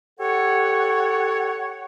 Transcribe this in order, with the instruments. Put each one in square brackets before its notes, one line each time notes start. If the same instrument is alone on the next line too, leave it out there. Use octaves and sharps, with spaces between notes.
[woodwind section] G4 A4 C#5 F#5